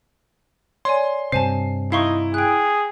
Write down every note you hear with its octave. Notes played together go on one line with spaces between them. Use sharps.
C#5 D5 G#5 C6
G2 C3 C5 G#5 A5 C7
D#4 E4 F5 C6 C#6
G#4 G5 F#6